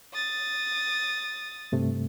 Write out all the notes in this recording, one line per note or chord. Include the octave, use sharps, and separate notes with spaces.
D#6 A6
G2 C3 A3